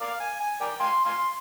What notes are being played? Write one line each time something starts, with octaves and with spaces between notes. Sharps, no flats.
A#4 D5 F5
G#5
G#5
A#4 D5 G5
F5 G#5 C6
F5 G#5 C6